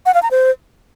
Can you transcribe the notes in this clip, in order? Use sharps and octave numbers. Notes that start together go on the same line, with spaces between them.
F#5
F5
A#5
C5